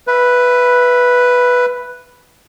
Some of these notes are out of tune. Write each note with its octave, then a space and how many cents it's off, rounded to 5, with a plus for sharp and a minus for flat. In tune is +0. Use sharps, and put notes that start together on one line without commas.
B4 +0 E5 +20